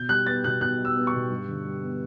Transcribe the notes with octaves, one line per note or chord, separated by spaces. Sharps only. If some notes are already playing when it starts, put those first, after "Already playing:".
Already playing: B2 G6
G3 F#6
B3 A6
B2 F#6
B2 F#6
G3
E6
B3
C#6
B2
G2
D3
G3
B3